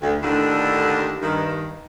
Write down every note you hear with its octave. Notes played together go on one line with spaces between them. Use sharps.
D2
D#2 A2 D3 D4
G2 D#3